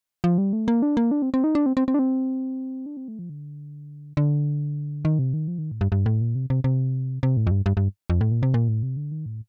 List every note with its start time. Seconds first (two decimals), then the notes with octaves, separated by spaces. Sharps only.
0.24 F3
0.38 G3
0.53 A3
0.68 A#3
0.82 D4
0.97 A#3
1.11 D4
1.22 C4
1.34 C4
1.44 D#4
1.55 D4
1.66 C4
1.77 C4
1.88 C4
1.94 D4
1.99 C4
2.86 D4
2.97 C4
3.08 A3
3.19 F3
3.30 D3
4.17 D3
5.05 D#3
5.19 C3
5.34 D#3
5.48 F3
5.58 D#3
5.71 A2
5.81 G2
5.92 G2
6.06 A2
6.21 A#2
6.35 C3
6.50 C3
6.64 C3
7.23 C3
7.37 A2
7.47 F2
7.51 G2
7.66 G2
7.77 G2
8.10 F2
8.21 A2
8.32 A#2
8.43 C3
8.54 A#2
8.68 A2
8.83 C3
8.97 D3
9.12 D#3
9.26 A2